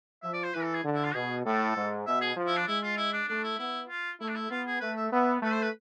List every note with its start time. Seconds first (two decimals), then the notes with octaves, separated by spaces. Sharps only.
0.23 F3 E5
0.33 D5
0.44 C5
0.54 E3 B4
0.64 A4
0.74 G#4
0.84 D3
0.95 E4
1.04 F4
1.14 B2 G#4
1.45 A2 A4
1.76 G#2
2.07 B2 E5
2.21 G#4
2.37 F3
2.47 E4
2.57 D4
2.68 G#3 E4
2.83 F4
2.97 E4
3.13 D4
3.28 A3 D4
3.44 E4
3.59 B3 E4
3.90 F4
4.21 A3 E4
4.28 D4
4.35 E4
4.51 B3 F4
4.66 G#4
4.81 A3 B4
4.96 E5
5.12 B3 E5
5.42 A3 B4
5.53 C5
5.62 B4